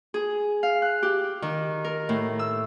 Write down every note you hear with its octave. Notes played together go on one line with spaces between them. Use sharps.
G#4
F5
F#6
G4
D#3
A#4
A2
E6